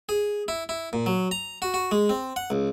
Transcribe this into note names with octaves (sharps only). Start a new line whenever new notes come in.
G#4
E4
E4
A#2
F#3
A#5
F#4
F#4
G#3
C4
F#5
C#2